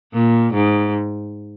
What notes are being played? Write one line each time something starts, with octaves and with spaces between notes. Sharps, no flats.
A#2
G#2